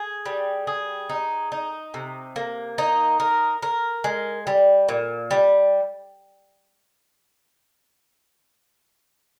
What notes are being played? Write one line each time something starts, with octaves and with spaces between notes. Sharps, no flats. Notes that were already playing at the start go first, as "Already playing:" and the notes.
Already playing: G#4
G3
G#4
D#4
D#4
C3
A#3
D#4
A#4
A#4
G#3
G3
A#2
G3